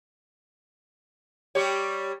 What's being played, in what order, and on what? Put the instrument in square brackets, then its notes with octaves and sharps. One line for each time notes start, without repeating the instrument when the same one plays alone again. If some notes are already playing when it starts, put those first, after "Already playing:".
[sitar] G3 G4 C#5